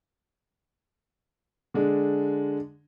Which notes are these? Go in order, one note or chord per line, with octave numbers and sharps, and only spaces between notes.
D3 G#3 D4